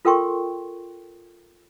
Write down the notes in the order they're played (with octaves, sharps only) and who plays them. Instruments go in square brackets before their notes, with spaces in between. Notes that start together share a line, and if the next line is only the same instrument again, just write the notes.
[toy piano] F4 A4 A#4 G5 C6 C#6